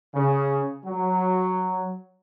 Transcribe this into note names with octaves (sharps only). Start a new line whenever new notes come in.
C#3
F#3